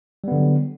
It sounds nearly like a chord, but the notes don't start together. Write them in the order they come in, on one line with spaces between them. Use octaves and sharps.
G3 B3 D3 F#3